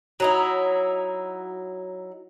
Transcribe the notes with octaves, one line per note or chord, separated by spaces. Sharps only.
F#3 D#4 E4